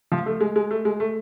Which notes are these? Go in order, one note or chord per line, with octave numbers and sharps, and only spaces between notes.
F3
A3
G#3
G#3
A3
G#3
A3